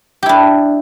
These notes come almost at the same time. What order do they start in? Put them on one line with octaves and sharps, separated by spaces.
G4 E4 D4